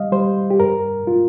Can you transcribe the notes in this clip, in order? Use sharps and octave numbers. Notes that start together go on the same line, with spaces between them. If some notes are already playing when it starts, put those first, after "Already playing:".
Already playing: G3 D#5 F5
G3 C5
G4
G2 A#4
F4